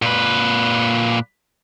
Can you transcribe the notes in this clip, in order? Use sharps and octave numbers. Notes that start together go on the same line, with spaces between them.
A#2 B4